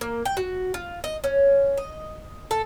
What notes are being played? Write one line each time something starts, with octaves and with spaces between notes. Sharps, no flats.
A#3
G5
F#4
F4
D#5
C#4
D#5
A4